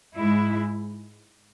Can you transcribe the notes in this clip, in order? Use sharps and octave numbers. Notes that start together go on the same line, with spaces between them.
G#2 G#3 E4